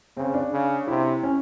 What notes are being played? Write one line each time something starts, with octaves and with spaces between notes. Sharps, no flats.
C#3 C4
D4
C#3
C3 E4
C#4